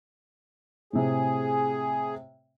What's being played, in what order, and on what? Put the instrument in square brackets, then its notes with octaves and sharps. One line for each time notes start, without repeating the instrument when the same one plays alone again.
[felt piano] A2 C3 [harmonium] G#4